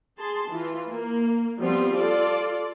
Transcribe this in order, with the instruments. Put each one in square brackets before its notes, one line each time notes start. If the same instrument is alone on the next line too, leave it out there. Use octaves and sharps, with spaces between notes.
[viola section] G#4 A5 C6
E3 F4
A#3
F3 G3 B3 C4 F4
F4 A4 D5